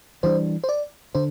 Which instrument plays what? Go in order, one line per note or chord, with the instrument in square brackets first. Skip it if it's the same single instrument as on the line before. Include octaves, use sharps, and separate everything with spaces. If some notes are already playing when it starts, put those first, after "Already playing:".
[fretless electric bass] E3 G3 D4 [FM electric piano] C5
[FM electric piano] C5
D5
[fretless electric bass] D3 [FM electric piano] C5